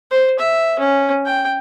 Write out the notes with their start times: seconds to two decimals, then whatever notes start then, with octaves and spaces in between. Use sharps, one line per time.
0.11 C5
0.39 E5
0.79 C#4
1.26 G5